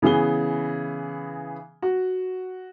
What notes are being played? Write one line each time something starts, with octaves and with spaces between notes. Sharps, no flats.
C#3 E3 B3 G#4 G7
F#4